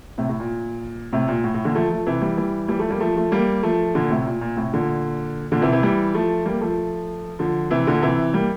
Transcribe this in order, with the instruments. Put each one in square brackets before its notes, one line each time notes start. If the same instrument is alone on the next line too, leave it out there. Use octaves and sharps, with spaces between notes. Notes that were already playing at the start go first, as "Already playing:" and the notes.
[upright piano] A2 C3
A2
A#2
A2 C3
A#2
A2
A2
A#2 D3
F3 A3
F3 A3
C3 E3
E3 G3
E3 G3
E3 G3
F3 A3
G3 A#3
F3 A3
F3 A3
G3 A#3
F3 A3
A#2 D3
A2 C3
A#2
A#2
A2 C3
A#2 D3
A#2 D3
C3 E3
C3 E3
E3 G3
F3 A3
G3 A#3
F3 A3
D3 F3
C3 E3
A#2 D3
C3 E3
G3 A#3